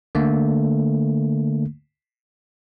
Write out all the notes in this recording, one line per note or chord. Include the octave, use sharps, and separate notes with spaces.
D3 A3 A#3